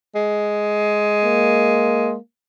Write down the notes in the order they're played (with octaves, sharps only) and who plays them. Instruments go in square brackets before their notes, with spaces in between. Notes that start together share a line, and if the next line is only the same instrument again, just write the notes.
[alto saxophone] G#3
[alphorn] A#3